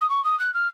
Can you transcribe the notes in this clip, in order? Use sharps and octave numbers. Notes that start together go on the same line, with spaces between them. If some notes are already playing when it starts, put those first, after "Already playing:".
D#6
C#6
D#6
F#6
F6